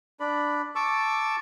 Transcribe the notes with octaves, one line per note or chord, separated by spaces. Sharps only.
D4 D5 B5
A5 C#6 D6 E6